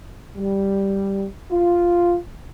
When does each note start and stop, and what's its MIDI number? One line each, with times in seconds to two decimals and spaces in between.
0.37 1.26 55
1.51 2.17 65